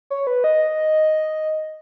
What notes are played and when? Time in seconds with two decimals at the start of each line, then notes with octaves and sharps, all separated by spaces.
0.10 C#5
0.27 B4
0.44 D#5